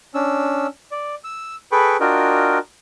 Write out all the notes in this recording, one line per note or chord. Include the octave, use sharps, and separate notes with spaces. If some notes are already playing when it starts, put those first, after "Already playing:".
C#4 D4 E6
D5
E6
G#4 A4 B4 G5 B5 C#6
D4 F4 F#4 A#4 D#5 G5